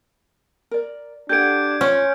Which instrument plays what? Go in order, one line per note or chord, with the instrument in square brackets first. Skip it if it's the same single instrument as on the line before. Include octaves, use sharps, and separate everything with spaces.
[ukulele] A#4 D5
[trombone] D4 [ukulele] G4 A4 F#5 [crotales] G6 G#6 D7
[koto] C#4 [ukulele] F4